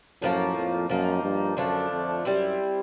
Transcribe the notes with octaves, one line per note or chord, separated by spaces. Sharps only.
F#2 A2 F3 A#3
F2
F#2 F3 A#3 D#4
G2
F#2 D3 F3 A3 D4
F2
F#2 G3 C4 E4